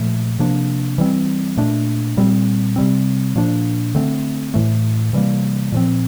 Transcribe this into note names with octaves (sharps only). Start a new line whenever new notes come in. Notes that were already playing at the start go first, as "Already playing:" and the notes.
Already playing: A#2 F3 A3
C3 F3 A#3 D4
E3 G3 C4
A#2 A3 D4
A#2 G3 C4
C3 G3 C4
A#2 F3 A#3 D4
D3 A3 C4
A2 E3 A3
C3 E3 G3 A#3
A#2 F3 C4